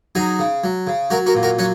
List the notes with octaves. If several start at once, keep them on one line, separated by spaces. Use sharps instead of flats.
F#3 D#4 G#4
C#3
F#3
C#3
F#3 F#4 A#4
F#4 A#4
A#2
F#4 A#4
F#3 C#4 F#4